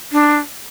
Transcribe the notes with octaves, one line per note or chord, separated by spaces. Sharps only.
D4